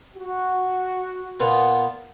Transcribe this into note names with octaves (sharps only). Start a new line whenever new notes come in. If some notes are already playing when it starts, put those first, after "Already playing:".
F#4
A#2 B3 F4